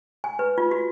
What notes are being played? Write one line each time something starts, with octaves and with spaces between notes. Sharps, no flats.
G#5
B4
F4
F#4